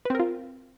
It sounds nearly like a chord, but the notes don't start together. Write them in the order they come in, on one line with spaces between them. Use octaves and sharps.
B4 C4 A#4 F4